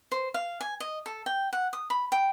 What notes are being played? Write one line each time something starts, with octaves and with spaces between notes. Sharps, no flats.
C5
F5
G#5
D#5
A4
G5
F#5
D#6
B5
G5